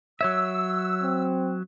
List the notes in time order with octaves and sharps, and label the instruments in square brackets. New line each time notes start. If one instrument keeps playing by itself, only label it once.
[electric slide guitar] F#3 C#5 E5 [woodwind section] E6
[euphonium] C4